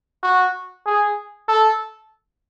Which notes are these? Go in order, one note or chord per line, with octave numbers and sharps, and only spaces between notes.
F#4
G#4
A4